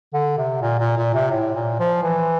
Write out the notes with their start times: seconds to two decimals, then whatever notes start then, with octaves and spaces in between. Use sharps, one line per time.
0.13 D3
0.38 C3
0.61 A#2
0.79 A#2
0.97 A#2
1.14 C3
1.31 A2
1.55 A#2
1.79 F3
2.03 E3